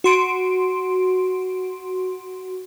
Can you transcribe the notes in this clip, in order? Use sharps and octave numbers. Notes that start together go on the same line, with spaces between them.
F#4 C6 D7